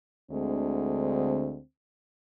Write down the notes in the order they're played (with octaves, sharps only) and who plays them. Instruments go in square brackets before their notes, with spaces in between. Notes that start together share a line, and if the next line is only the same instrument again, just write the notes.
[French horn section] D2 D3 G#3 C4